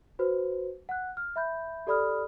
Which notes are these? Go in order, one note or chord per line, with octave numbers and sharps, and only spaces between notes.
F#4 B4 C5
F#5 F#6
F6
E5 B5 G6
G4 A4 D5 B5 D#6 F6